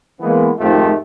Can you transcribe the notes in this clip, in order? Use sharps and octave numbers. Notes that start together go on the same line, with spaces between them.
E3 G#3 A#3 B3
F2 G#2 D#3 A3 F4 G4